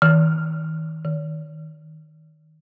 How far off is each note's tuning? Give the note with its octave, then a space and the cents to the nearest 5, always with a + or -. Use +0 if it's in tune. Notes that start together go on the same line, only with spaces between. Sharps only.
D#3 +40
D#3 +0